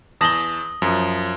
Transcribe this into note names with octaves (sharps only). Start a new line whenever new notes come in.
E2 A5 D#6 A#6 F#7 G7
F#2 F3